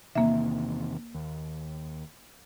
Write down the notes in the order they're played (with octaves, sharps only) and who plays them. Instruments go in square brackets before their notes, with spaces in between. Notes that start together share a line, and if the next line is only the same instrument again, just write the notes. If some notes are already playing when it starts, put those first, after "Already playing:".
[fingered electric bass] E2 C3 D#3 [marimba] A#3 E5
[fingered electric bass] D#2